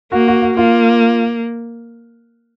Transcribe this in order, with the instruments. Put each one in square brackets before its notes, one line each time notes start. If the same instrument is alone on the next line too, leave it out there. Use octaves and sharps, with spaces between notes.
[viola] A#3 [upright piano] F#4
[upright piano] F#4
F#4
[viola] A#3 [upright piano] F4